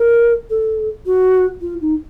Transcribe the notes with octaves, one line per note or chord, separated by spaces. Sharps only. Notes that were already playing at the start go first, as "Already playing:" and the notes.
Already playing: A#4
A4
F#4
F4
D#4